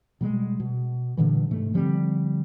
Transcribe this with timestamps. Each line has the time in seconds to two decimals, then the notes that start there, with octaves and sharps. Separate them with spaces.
0.21 B2 G3 G#3
0.60 B2
1.17 G2 A#2 D3 E3
1.51 G#2 C3 A3
1.74 D3 F3 G3 C4